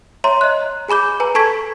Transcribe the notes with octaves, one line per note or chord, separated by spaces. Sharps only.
C#5 E5 A#5 C6
D#5 F#6
G#4 G#5 B5 D6 G6
B4 G#5 A#5
A4 A5 C#6 G#6 B6